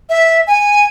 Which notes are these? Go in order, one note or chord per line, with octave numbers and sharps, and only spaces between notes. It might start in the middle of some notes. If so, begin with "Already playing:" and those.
E5
G#5